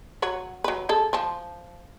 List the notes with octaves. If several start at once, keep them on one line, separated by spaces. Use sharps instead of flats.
F#3 C#5 F#5
F#3 B4
G#4 A4 A5
F3 A5